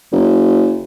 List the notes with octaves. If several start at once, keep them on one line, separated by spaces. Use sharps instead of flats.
F#1